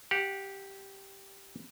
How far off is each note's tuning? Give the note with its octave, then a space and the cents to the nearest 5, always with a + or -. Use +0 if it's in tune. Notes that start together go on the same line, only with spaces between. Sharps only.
G4 +0 F#5 -30